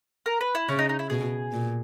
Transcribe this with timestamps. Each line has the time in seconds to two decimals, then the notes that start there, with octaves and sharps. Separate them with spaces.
0.26 A#4
0.41 B4
0.55 E4
0.69 C#3 C#4
0.79 D#4
0.89 D#4
0.99 E4
1.10 B2 G#4
1.52 A#2